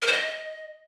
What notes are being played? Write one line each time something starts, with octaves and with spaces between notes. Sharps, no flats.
A#4
C5
D#5